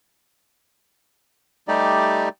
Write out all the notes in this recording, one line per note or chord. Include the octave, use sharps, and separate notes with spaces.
G3 A3 D#4 G4 D5